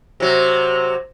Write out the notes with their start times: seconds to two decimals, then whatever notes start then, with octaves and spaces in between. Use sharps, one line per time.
0.20 C3 F#3